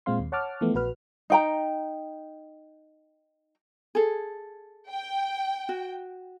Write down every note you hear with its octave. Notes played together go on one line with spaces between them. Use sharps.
A#2 G#3 C4 F5 C6
D#2
C#5 F#5 A5 D6 F6
E3 F3 A3 B3
A#1 F#4 B4 F6
D#4 G5 A#5
G#4 A4
G5
F#4